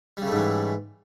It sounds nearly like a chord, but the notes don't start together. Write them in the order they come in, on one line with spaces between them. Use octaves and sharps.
G3 C#3 A3 G#2 E3